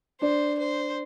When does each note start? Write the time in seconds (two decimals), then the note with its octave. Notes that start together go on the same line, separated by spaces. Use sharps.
0.22 D4 C5
0.59 C5